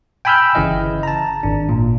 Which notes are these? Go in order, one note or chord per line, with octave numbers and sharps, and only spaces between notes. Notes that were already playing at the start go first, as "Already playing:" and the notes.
G5 G#5 B5 E6 F6 G6
G1 C#3 E3 E4 D#5
A5 A#5
G#1 D4
A#2